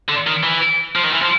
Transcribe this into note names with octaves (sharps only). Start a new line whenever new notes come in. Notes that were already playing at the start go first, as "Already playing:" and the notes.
D3
D#3
E3
F3
D#3
E3
F3